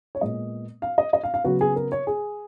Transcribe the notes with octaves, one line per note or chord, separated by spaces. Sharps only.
C#5
A#2 G#3 B3 D#5
F5
D#5
D#5
F5
F5
C#3 F#3 B3 F#4
G#4
A#4
C#5
G#4